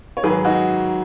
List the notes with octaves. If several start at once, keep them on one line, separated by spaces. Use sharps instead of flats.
C#5
G#2 D#3 F#3 G#4 B4
D#4 F#4